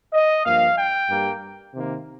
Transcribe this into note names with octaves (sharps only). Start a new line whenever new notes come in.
D#5
G2 F3 A#3 F5
G5
G2 G3 A#3
C3 D#3 A#3